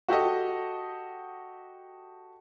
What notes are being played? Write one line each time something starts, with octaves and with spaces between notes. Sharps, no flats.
F#4 G4 A4 D#5